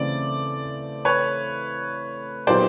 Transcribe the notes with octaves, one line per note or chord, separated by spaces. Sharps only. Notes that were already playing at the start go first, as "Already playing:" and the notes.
Already playing: C#3 E3 A3 C4 D5
B4 C#5
A#2 F#3 B3 D#4 G4 C5 D5